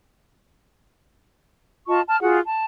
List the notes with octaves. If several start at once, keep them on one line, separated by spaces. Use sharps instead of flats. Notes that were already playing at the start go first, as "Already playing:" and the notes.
F4 D#5 A5 C#6
A5 F6
F4 F#4 G#4 F#5
A5